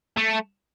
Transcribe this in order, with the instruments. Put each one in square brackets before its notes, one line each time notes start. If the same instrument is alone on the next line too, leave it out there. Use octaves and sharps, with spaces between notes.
[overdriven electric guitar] A3